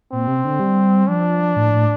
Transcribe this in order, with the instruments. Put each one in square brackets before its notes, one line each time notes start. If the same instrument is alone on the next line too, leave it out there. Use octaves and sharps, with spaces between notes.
[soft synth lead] A#2 [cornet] C4
[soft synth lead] C3
D3
G3
[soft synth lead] F3 [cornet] D4
[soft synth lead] A2
A2